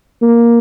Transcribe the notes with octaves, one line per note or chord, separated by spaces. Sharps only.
A#3